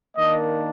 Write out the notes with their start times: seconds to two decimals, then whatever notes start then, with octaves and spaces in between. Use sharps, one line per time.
0.17 D#3 A#3 D4 D#5